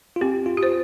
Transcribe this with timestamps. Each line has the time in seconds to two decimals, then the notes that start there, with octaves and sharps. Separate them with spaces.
0.16 F4
0.21 C4 G4
0.46 F4
0.57 G4
0.63 C5